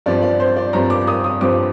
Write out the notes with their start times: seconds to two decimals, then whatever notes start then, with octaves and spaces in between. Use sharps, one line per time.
0.06 G2 F3 C4 D5
0.22 D5
0.40 C5
0.57 D5
0.73 G2 F3 C4 A#5
0.90 D6
1.07 D#6
1.24 D#6
1.41 G2 F3 C4 D6